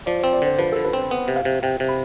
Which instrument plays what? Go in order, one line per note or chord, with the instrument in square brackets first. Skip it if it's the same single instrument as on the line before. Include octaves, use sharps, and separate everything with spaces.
[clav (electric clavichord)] F3 [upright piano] D5
[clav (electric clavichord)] C4 [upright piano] C5
[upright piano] D5
[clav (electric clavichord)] D3 [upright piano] C5
[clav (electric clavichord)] F3 [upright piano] B4
[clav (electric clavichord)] D3 [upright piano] A4
[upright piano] B4
[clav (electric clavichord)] C4 [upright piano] C5
[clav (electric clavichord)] B3
C3
[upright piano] F5
[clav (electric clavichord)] C3
[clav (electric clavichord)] C3 [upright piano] G5
[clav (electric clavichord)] C3
[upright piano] B5